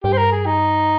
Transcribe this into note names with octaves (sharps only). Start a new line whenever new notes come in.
G2 G4
C5
A#4
G#4
D#4